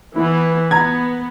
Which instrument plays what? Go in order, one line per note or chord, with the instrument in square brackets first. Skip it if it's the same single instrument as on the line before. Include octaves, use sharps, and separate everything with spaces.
[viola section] E3 B3 B4 [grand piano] E4
[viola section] B3 [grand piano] A#5 G#6